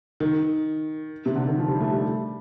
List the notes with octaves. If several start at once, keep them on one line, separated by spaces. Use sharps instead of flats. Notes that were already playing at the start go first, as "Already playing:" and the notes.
D#3
C3
D3
D#3
F3
G3
A3
G3